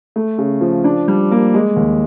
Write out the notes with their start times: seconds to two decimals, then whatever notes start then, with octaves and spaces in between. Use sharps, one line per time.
0.16 A3
0.38 C#3
0.61 F3
0.84 D4
1.08 G3
1.31 A#3
1.54 G#3
1.77 D#2